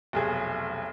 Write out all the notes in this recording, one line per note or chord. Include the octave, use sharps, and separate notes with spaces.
F1 B1 G#4